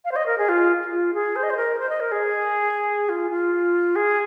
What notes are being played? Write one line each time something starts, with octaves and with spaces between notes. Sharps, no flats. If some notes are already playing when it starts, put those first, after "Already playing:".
F5
C5
D#5
A#4
G#4
F4
F4
G#4
C5
D#5
C5
A#4
C5
D#5
A#4
G#4
F4
F4
G#4